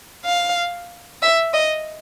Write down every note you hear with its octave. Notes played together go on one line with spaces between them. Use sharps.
F5
E5
D#5